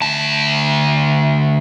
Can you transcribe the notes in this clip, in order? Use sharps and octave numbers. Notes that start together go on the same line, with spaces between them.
D2 A5